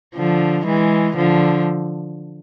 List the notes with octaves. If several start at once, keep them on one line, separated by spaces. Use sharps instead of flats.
D3 F3
E3 G#3
D3 F3